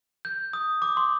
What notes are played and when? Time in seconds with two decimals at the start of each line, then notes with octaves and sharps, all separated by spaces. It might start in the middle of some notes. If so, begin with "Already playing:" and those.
0.25 G6
0.53 D#6
0.82 D6
0.97 C6